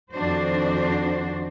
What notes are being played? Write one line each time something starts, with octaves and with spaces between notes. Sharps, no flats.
F2 D#3 D4 F#4 C5